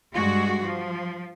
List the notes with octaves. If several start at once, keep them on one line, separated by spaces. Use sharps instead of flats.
G2 G#3 F#4
F3